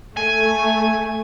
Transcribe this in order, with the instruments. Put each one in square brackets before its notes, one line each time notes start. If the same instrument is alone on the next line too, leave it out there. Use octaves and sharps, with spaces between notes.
[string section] A3 [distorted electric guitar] G#5